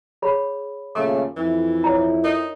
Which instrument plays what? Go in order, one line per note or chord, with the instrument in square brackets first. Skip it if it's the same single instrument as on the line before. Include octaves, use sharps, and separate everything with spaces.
[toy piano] G#4 C#5 B5
[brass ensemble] D#2 A#2 C#3 [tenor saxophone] A3 [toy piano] D6
[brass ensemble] F2 E4 [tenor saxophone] E3
[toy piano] C#5 D5 A#5
[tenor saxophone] D#4 [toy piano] A#4